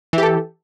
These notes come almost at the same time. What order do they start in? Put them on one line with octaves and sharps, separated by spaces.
E3 G4 A4